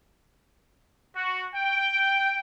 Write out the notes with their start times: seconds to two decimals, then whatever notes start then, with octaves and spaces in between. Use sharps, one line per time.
1.14 F#4
1.55 G5